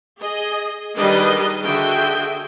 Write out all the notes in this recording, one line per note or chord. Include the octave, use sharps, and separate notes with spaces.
G#4 D#5
D#3 G3 D4 G#4 B4 D#5
D3 F#4 G#4 E5 G5